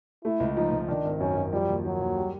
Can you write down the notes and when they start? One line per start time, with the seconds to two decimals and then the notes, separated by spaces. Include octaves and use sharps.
0.24 A3 E4
0.40 C#2
0.56 F3 D#4
0.72 C#2
0.88 D#3 D4
1.04 G#1
1.20 F#2 C#4
1.37 F#2
1.53 F3 G3
1.68 D#2
1.85 F3 F#3
2.01 D#2
2.16 G3